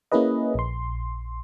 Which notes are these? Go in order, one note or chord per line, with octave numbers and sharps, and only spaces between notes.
A#3 C#4 E4 G#4 B4 D#5
A#1 C6